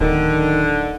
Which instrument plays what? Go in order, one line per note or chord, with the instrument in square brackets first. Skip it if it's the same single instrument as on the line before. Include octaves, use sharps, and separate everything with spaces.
[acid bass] D1 [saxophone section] D3 [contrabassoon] D#3